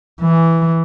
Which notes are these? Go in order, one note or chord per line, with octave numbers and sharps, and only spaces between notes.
E3